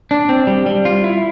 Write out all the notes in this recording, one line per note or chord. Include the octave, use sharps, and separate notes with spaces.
D4
C4
G3
G3
F4
E4